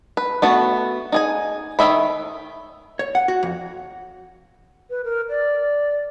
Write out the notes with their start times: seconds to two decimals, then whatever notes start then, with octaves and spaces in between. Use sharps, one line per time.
0.17 B4
0.42 A3 B3 F#4
1.12 D#4 G#4 G#5
1.79 D#3 G#4 D#5 E5 B5
2.99 C#5
3.15 F#5
3.28 F#4
3.43 F2
4.90 B4
5.04 A#4
5.29 D5